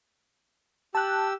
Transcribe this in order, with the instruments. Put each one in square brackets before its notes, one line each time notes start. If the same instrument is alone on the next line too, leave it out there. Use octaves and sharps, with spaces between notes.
[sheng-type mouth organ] G4 E6 [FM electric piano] A5 F#6